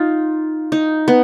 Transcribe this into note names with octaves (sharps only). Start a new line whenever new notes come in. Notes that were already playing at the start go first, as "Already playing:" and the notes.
Already playing: D#4 F4
D#4
B3